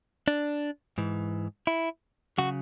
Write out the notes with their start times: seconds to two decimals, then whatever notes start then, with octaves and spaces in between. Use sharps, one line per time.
0.28 D4
0.98 G#2 E3
1.67 E4
2.38 C#3 F#3 F#4